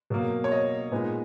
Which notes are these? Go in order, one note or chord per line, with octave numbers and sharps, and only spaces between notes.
B2 F#3 A#3
C#5
D#5
A#2 G#3 B3 D#4